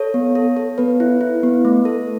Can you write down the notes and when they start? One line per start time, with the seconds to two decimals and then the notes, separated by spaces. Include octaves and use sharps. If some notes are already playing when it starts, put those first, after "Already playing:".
Already playing: A4 C#5
0.14 B3
0.35 A4
0.57 A4
0.78 B3 B4
1.00 E4
1.21 E4
1.43 B3
1.65 A3
1.85 A4